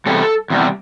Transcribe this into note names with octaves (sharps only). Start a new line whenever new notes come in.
E2 C3 G3 A4
E2 C3 G3